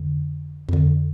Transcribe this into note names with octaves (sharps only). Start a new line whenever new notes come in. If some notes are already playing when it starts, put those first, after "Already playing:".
Already playing: F2 D3
F2 D3